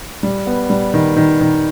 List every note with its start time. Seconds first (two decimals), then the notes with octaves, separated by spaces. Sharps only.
0.23 G3
0.47 B3
0.70 G3
0.94 D#3
1.16 D#3
1.41 D#3